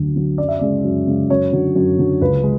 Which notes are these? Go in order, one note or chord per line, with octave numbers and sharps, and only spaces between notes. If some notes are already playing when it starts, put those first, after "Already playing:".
Already playing: D2 D3 F#3
D3 F#3
F#2 D5
E5
C#3 G#3 D5
F#2
C#3 G#3
F#2 C#5
D3 F#3
F#2
D3 F#3
C#2 B4
G#3